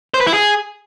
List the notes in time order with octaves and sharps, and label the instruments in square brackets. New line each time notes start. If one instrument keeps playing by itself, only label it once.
[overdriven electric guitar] C5
B4
E4
G#4